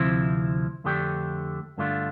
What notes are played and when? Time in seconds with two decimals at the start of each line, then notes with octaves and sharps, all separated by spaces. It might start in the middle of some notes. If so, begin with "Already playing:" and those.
Already playing: D2 C3 F3 C4 E4
0.84 F2 D3 A3 D4 G4
1.78 G2 D3 A3 D4 F4